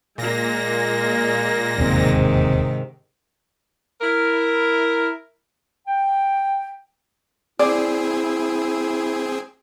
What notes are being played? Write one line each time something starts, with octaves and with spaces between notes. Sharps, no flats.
A#2 G#3 A#3 A#6
E1 D#2 G#2 C3 D#3 C4
E4 A#4
G5
C4 E4 G#4 D5